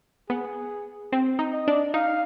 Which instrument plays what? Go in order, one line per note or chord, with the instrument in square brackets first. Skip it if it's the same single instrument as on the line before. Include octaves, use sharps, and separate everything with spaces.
[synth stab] B3 [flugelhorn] G#4
[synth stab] C4
D#4
[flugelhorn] D#5
[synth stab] D4
[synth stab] D#4 [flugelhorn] F5